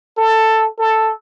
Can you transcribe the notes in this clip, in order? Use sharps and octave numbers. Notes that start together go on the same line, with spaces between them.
A4
A4